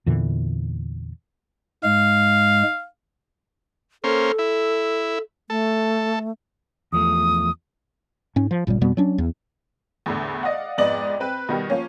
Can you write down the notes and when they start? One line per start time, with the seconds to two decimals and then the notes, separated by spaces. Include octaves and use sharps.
0.06 E2 A#2 D3 E3
1.84 G#2 G#3 F5
4.04 A#3 C#4 A4 C5
4.39 E4
5.50 A3 A4
6.92 E2 F3 A3 D#6
8.36 G#2 C#4
8.51 F3
8.67 G1 A#2 C#3 G3
8.81 F2 B2 G3 B3
8.97 F#3 C#4 D4
9.18 E2
10.06 E2 A2 D3
10.43 D5 D#5 F5 F#5
10.78 F2 G#2 B3 D5 D#5 F#7
11.20 C4 B4
11.49 B2 D#3 G3
11.70 F3 A#3 C#4